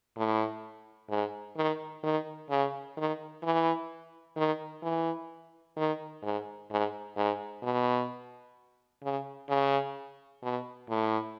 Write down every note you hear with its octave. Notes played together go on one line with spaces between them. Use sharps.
A2
G#2
D#3
D#3
C#3
D#3
E3
D#3
E3
D#3
G#2
G#2
G#2
B2
C#3
C#3
B2
A2